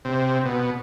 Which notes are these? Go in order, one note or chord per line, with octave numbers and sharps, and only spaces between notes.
C3
B2